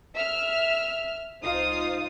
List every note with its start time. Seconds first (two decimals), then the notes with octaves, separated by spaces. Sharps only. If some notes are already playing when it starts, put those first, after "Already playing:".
0.15 E5 F6
1.44 C#2 D#4 F4 C5 F5 D#6